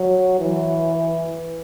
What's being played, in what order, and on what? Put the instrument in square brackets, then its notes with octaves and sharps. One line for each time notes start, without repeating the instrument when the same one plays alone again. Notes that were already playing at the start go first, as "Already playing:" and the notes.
Already playing: [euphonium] F#3
E3